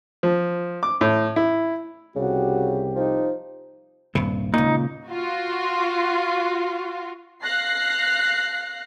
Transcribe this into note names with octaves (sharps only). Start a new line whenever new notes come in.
F3
D6
A2
E4
C2 C#3 F#4 G4
F3 D#4
D#1 G2 C3
C#2 A#2 D#4
F4 F#4
F5 F#6 A#6 C7